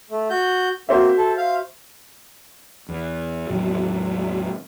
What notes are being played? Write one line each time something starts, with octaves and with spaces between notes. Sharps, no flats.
A3
F#4 G6
A#3 C4 F#4 C5 E5
A4
F5
E2
E2 A2 D#3 F#3